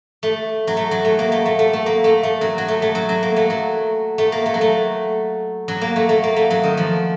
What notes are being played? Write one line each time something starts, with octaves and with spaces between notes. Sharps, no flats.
A3
F#3
A3
F#3
A3
A#3
A3
A3
A3
A3
A#3
A3
A3
F#3
F#3
A3
A3
F#3
F#3
A#3
A3
F#3
A3
A#3
A3
F#3
A3
F#3
A#3
A3
A3
A#3
A3
F#3
D#3
F3